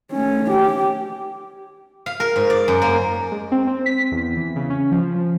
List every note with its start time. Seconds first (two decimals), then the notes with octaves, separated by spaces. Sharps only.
0.12 A3 C#4
0.51 G4
2.06 F5
2.20 A#4
2.36 G#2
2.50 D5
2.68 F#2
2.82 A#3
3.31 G#3
3.52 C4
3.67 C4
3.86 B6
4.11 E2
4.37 E3
4.56 C#3
4.70 C#4
4.92 F3
5.16 F3